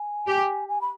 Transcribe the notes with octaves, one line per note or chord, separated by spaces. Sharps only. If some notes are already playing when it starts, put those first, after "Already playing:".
Already playing: G#5
G4
G#5
B5